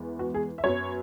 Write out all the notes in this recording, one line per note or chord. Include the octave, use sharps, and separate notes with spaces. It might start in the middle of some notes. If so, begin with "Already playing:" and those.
Already playing: E2 E3 G#3 B3
F#4
G#4
E5
F#2 F#3 B3 C#5